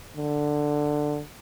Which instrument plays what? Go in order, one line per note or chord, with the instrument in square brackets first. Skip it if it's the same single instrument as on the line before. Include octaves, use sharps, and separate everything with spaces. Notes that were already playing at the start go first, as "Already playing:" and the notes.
[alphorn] D3